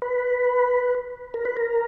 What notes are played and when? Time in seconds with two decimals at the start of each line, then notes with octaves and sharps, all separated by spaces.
0.02 B4
1.34 A#4
1.45 B4
1.57 A#4